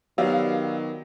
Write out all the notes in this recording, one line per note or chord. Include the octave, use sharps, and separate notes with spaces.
D#3 F#3 B3 G4 D5 F5 E6